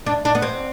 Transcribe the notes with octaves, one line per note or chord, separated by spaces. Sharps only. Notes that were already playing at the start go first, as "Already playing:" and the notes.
D4
D4
B3
C4